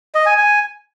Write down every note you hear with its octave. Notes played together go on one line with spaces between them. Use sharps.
D#5
G#5
G#5